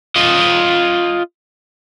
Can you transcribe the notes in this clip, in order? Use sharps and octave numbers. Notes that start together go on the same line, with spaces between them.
F4 D#5